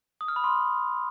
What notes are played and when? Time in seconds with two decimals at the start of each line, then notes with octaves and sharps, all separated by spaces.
0.21 D#6
0.28 F6
0.36 B5
0.44 C6